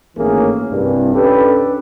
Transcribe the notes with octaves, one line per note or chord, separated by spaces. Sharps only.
G#1 A2 E3 A#3 C#4 G#4
C2 G2
C#4 D4 G4 A4 B4